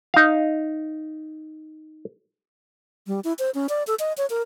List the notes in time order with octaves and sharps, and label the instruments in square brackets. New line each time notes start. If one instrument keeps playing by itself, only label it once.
[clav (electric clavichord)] D#4 F5
[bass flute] G3
E4
C5
C#4
D5
A4
D#5
C#5
A#4